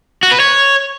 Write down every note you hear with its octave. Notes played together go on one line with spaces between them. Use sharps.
F#4
B4
C#5